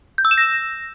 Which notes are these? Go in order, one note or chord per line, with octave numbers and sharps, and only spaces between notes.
G6
E6
E7
A#6